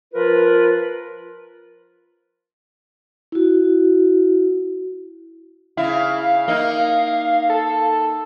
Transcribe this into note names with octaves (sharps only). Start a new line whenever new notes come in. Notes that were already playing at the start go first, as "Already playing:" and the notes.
F3 F4 A#4 B4
E4 F#4
C#3 E4 F5
A#3 D#4
A4